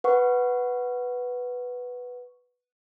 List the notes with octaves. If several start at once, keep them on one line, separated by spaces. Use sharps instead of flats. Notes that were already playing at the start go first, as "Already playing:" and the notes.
B4 F#5 C#6